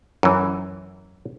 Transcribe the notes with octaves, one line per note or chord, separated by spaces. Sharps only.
F#2 E3